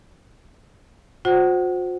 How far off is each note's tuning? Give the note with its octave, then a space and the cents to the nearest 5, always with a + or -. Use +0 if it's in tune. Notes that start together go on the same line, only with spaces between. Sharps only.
F#4 -45 C5 +0 F#5 +25